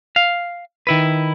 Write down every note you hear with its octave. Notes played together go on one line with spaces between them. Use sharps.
F5
D#3 E4 B4